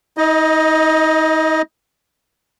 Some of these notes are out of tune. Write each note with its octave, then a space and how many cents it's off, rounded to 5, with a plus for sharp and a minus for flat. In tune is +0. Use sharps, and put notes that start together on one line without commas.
D#4 +40 D#5 +0